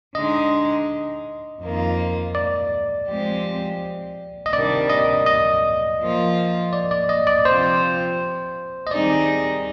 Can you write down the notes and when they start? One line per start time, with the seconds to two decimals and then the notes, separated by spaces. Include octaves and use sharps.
0.15 D3 G#3 D#4 D#5
1.62 F2 D#3 A#3 F4
2.35 D5
3.08 F3 G#3 C4 G4 C5
4.46 D#5
4.53 C3 D#3 G3 D4 D5
4.90 D#5
5.26 D#5
6.00 F3 A#3 F4 C5
6.73 D5
6.91 D5
7.09 D#5
7.27 D5
7.45 C3 F3 C4 F4 C5
8.87 D#5
8.91 D#3 G3 C4 D#4 G#4 D5